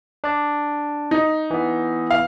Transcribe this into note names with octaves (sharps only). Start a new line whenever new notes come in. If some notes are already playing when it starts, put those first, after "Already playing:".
D4 D5
D#4
E3 B3
F5